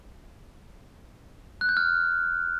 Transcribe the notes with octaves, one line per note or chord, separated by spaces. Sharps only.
F#6
G6
F6